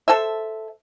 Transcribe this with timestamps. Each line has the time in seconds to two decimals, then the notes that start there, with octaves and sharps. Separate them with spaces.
0.08 A4 C5 E5